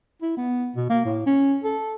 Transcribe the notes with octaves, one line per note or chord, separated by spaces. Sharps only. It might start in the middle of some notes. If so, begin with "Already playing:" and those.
E4
B3
B2
A#3
A2
C#4
A4